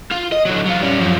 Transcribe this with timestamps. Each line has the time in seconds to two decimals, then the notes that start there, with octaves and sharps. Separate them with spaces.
0.12 F4
0.32 D#5
0.45 D3 F#3
0.65 F#3 F4
0.81 G3 C#4
0.98 F#2 F3